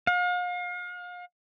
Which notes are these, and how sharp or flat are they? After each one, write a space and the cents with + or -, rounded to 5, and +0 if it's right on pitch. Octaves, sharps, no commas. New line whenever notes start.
F5 +40